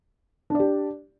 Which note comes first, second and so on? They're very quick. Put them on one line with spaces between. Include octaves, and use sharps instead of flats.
D4 D5 G4